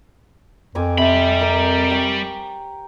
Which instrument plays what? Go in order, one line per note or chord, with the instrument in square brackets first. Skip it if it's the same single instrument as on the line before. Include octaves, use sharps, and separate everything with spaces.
[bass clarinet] F2 [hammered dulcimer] C4 G#5 D6
[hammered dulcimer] C3 [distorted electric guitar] G3 B5
[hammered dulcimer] A#4
G5 C#6